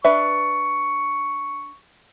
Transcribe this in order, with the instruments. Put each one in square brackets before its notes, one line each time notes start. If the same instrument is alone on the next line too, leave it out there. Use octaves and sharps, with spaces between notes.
[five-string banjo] D4 B4 E5 [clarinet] C#6